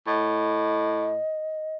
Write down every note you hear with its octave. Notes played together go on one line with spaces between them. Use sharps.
A2 D#5